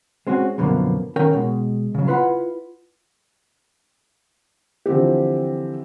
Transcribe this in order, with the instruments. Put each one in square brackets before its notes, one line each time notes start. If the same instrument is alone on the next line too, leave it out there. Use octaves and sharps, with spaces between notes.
[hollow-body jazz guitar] G#3 C4 C#4 F#4
F#2 B2 D3 F3 A#3
D#3 C#4 A#4 G5
B2 G#3
C#3 F#3
E4 F4 B4 E5 F#5 B5
[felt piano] D3 E3 F3 C4 G4